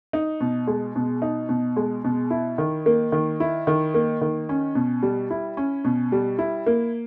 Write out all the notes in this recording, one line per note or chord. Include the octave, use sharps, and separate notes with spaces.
D#4
B2
G#3
B2
D#4
B2
G#3
B2
E4
D#3
A#3
D#3
E4
D#3
A#3
D#3
C#4
B2
G3
E4
C#4
B2
G3
E4
A#3